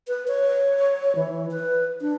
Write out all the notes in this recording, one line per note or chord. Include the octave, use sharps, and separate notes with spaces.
B4
C#5
E3
B4
D4